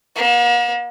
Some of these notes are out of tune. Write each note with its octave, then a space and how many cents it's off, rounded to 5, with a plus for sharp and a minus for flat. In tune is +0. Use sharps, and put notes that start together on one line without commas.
A#3 +45